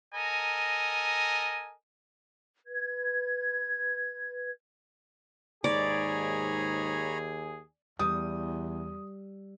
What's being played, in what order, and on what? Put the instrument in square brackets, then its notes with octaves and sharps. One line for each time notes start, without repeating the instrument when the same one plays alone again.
[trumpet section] A4 A#4 D#5 G#5 A#5
[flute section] B4 G#6
[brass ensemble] D#2 G#4 [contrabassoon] G#2 [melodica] C#5 A#5 B5 [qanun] D5
[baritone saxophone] E2 [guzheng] G3 [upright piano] D#6